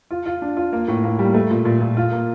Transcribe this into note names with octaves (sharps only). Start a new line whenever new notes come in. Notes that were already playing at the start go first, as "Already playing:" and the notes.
F4
F4
D4
F4
A#3
A2
A#3
G3
A3
A#2
A#2
A#2
F4
A#3